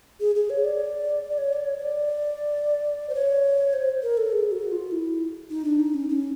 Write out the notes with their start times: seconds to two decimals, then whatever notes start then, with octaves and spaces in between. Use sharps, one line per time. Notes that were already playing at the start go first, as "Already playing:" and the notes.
0.20 G#4
0.35 G#4
0.50 C#5
0.64 D5
1.30 D5
1.38 C#5
1.53 D5
1.68 C#5
1.78 C#5
1.82 D5
3.09 C5
3.15 C#5
3.73 C5
4.03 A#4
4.17 A4
4.32 G#4
4.51 F#4
4.72 F4
4.91 E4
5.50 D#4
5.64 D4
5.80 D#4
5.94 C#4
6.09 C#4